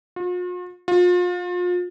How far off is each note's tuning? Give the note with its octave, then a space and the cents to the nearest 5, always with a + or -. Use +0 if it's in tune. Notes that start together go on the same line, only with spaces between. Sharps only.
F4 +45
F4 +35